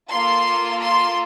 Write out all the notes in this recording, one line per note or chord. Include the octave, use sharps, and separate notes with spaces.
A#3 F4 A4 C6
C6